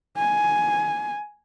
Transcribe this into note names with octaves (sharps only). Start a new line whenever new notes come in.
G#5